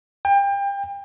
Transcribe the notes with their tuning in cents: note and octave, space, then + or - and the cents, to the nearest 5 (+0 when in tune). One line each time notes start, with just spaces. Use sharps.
G5 +30